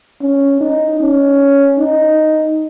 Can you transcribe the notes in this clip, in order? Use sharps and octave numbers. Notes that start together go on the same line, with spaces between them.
C#4
D#4
C#4
D#4